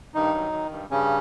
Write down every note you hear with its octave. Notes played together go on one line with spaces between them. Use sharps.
G2 D#3 D#4
F#3
D#3
G2
G2 C#3 C#4